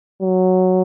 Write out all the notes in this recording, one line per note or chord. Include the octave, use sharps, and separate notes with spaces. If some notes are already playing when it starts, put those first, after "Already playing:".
F#3